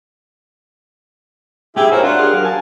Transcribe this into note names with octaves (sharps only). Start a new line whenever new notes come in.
G#2 E4 G4 G#4 E5 G5
F#4 A#4 C5 C#5
D4 F4 F#5
G4 G#4 A#4 F5
F#3 A#4
G#5 A5